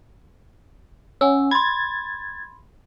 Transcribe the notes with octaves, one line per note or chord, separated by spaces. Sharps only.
C#4 F#5 G#5 E6
B5 C6 G#6 A6